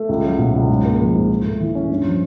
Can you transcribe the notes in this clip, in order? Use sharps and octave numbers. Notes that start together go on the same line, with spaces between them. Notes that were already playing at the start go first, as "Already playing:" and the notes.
Already playing: A3
C#2
F#3
B2
C#2
G#2
A#3
F3
G#2
G#2
A3
E3
C#4
G2
F3